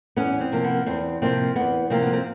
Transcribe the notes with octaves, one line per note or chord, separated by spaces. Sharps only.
E2 B3 C#4
C4
C3 F3 A#3
B3
E2 C4
C3 F3 A#3 C4
E2 B3
C3 F3 A#3 C4
B3
C4